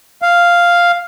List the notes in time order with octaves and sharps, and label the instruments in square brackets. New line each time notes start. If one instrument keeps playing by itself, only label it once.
[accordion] F5